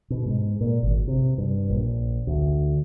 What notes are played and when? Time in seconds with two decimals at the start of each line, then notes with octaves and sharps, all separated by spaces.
0.10 B2
0.26 G#2
0.61 A#2
0.83 G#1
1.08 C3
1.38 G2
1.70 A#1
2.27 D2